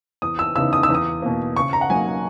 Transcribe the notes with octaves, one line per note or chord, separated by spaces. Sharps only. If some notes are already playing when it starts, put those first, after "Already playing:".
E2 D#6
E6
C#3 E3 B3 D#4 E6
D#6
E6
E2 D#6
B2 A#3
C#3 C#6
A#5
F#5
F#3 A#3 D#4 G#5